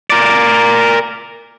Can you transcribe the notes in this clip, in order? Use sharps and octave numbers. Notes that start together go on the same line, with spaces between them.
A#4 D5